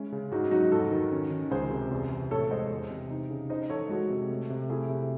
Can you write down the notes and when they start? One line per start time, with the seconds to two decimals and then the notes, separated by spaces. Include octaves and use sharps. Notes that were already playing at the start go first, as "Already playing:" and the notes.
Already playing: G#3 C#4 E4
0.12 C#3
0.32 G#2 D#4 F#4
0.51 F#3 D#4 F#4
0.72 G#2 F#4 A4
0.91 D#3
1.12 C#4
1.31 D#3
1.51 C#2 G#4 C5
1.71 C3
1.91 E2
2.10 C3
2.31 A2 A4 C#5
2.51 G#3 C5 D#5
2.70 E2
2.91 C3
3.11 D#4
3.31 C#3
3.50 D#4 C5 D#5
3.70 E3 A4 C#5
3.89 G#3 F#4 A4
4.10 C3
4.30 A3
4.50 C3
4.69 A3 E4 G#4
4.89 C3